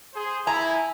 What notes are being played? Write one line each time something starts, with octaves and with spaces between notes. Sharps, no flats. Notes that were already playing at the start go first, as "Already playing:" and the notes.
G#4 C5
E4 G#5 A#5